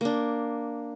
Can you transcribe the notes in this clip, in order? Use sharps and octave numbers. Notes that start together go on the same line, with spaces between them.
A#3 D4